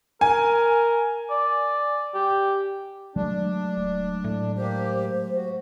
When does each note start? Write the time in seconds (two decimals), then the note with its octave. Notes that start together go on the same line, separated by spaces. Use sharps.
0.21 A#4 G#5
1.30 D5
2.15 G4
3.16 F#3 G#3 A3 D4
3.77 D1
4.24 A2
4.58 A#3 G4 C5
5.36 F#4